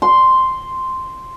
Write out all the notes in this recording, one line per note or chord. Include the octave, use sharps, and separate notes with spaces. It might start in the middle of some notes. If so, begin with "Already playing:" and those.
C6